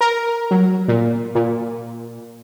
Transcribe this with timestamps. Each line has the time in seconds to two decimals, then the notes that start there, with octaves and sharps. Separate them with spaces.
0.01 A#4
0.51 F#3
0.88 A#2
1.35 A#2